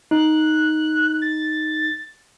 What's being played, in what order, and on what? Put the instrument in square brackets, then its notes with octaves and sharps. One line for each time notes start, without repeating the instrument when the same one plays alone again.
[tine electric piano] D#4 [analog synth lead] F#6
[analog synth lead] A6